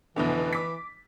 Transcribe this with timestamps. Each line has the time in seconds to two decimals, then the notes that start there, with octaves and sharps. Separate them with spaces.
0.16 F1 B2 D3 E3
0.53 D6 B6